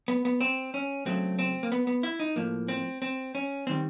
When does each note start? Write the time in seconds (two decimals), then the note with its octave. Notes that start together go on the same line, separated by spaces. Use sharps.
0.08 B3
0.25 B3
0.41 C4
0.74 C#4
1.05 C#2 C#3 F#3 A3 C4
1.39 C4
1.63 A#3
1.72 B3
1.87 B3
2.03 E4
2.20 D#4
2.36 A2 F3 A#3
2.68 C4
3.02 C4
3.35 C#4
3.67 D#3 G3 C4